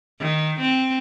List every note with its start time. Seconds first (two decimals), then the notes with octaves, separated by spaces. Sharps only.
0.20 D#3
0.60 C4